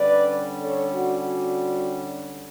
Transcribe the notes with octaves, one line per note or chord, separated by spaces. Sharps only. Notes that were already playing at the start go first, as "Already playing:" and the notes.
Already playing: D3 G3 C#4 B4 D5
A4 C#5
F#4
F#4